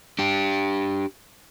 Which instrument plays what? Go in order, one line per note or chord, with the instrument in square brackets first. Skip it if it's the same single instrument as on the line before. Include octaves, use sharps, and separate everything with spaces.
[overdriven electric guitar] D4 G4